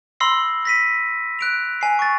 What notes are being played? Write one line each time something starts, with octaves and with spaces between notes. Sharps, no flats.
B5 C6 E6 A#6 C7
A#6 B6 D#7
F#6 D7 F7
G#5 C7
C#6 A6